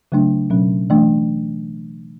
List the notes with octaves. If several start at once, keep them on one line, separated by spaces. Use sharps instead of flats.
C#3 F#3 A3 D4
B2 F#3 C#4
E3 A3 D4